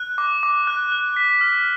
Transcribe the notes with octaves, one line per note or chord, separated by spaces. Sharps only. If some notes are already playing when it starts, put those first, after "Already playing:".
Already playing: F#6
D6
D6
F#6
F#6
B6
F6